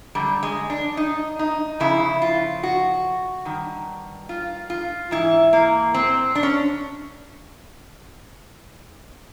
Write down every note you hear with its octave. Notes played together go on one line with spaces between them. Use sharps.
F#2 D3 G3
G#3
D4
D#4
D#4
F2 C#3 E4
F4
F#4
G2 D#3
F4
F4
G#2 E3 E4
A#3
C4
D4
C#4